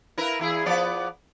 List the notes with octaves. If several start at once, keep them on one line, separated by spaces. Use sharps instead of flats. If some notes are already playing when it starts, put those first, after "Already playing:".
E4 A#4 B4
E2 E4 G#4
F3 B3 D5